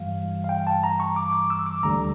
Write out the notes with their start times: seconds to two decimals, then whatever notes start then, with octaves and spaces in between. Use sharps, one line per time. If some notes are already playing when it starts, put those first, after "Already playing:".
Already playing: G2 E3 G3 F5
0.44 F5
0.49 G5
0.67 A5
0.84 A#5
1.00 C#6
1.16 D6
1.33 D6
1.50 E6
1.67 D6
1.83 D2 D3 G3 A#5